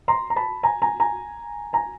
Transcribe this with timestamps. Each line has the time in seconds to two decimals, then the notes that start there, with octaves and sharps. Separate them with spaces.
0.08 A#5 C6
0.30 A#5
0.36 A5 B5
0.63 G#5 A#5
0.82 G#5 A#5
1.00 G#5 A#5
1.73 G#5 A#5